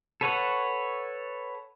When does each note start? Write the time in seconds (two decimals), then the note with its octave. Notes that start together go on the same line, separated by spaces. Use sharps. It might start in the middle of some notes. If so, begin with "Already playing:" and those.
0.21 A4 B4 C#5 F#5